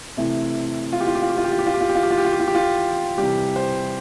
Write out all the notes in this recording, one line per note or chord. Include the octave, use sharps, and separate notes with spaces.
C3 E3 A3 C4 E4
F4
G4
F4
G4
F4
G4
F4
G4
F4
G4
F4
G4
F4
G4
F4
G4
F4
G4
F4
G4
F4
G4
F4
C3 E3 G3 G4
C5